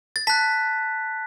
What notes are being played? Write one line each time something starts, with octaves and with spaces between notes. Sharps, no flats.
A6
A5 F#6 B6